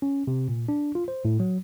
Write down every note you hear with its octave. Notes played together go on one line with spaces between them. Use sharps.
C#4
C3
A#2
D4
F4
C5
A2
F#3